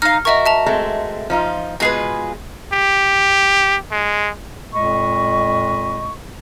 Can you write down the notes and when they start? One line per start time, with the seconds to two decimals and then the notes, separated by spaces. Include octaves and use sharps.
0.02 D#4 F5 F6
0.25 F#4 A#4 D#5 E5 C#6
0.46 E5 A5 F7
0.66 G#3 A3 C4
1.30 F3 D#4 F4
1.80 B2 G#3 F4 G#4 B4
2.73 G4
3.91 G#3
4.74 F2 A#2 G#3 D#5 B5 C#6